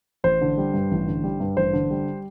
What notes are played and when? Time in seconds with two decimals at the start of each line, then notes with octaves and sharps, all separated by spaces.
0.24 A1 C5
0.41 D3
0.58 G3
0.74 G2
0.91 A1
1.07 D3
1.24 G3
1.40 G2
1.57 A1 C5
1.73 D3
1.90 G3